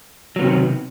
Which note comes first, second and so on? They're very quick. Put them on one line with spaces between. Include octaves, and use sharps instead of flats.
F#3 B3 C3 D#3